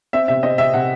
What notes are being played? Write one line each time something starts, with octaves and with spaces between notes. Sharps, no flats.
C4 E5
C3 E5
C4 D#5
C3 E5
C3 F#5